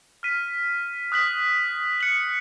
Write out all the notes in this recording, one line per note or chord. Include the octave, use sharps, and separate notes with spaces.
F6 B6 D#7
D#6 F#6 B6 F#7
F#6 C#7 F#7